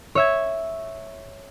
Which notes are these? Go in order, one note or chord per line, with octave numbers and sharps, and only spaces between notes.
C#5 E5 G#6